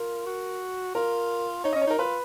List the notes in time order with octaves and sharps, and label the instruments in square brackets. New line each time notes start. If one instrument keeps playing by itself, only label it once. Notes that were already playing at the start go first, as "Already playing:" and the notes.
Already playing: [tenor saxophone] F4 [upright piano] A#4
[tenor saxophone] F#4
[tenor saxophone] F4 [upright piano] A#4
[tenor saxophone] D#4 [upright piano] C#5
[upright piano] D#5
[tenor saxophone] C#4
[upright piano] C#5
[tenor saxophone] D#4 [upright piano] A#4
[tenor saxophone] F4 [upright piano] B4